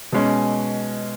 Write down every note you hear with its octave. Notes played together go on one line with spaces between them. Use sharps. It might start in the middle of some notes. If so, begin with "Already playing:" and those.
B2 G#3 C#4